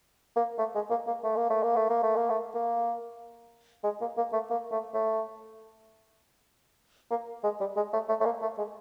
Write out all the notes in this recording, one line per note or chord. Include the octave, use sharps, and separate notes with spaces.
A#3
A3
G#3
A#3
A#3
A3
A#3
A3
A#3
A3
A#3
A3
A#3
A3
A#3
G#3
A#3
A#3
A3
A#3
A3
A3
A#3
G#3
G3
G#3
A3
A3
A3
A#3
A3
G#3